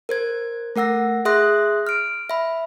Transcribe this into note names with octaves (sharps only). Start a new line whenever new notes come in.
A#4 C5 G#6
A3 A#4 F#5 E6 A#6
G#4 E5 C6 D#6 F#6 A#6
F6 D7
E5 B5